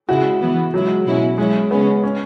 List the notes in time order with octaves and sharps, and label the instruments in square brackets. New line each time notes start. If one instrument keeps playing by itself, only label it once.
[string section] C#3 G#3 E4 [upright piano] F#4
[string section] E3 B3 E4
[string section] C#3 G#3 E4 [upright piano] F#3
[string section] B2 G#3 C#4 E4
[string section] F#3 C#4 E4 [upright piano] G#3
[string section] C#3 G#3 C#4 [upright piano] B3
[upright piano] C#4